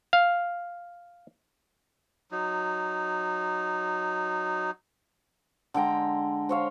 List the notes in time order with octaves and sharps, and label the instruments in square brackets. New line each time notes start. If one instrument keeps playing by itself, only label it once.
[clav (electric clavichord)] F5
[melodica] F#3 D#4
[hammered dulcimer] D3 G#3 G5 A#5
C5 C#5 F5